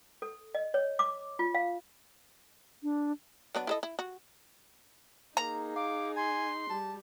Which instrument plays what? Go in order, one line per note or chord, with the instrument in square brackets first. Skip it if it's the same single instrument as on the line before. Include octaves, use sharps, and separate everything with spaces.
[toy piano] A4
D#5
C#5
D6
F4
F5
[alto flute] D4
[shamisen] F#3 B3 D4
E4 A4 D#5
E4
F#4
[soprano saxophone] A#3 [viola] D#4 G#4 [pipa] A#5
[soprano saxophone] F5 [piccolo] D6
[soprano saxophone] G#5 [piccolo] C6
[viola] G3 [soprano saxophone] A5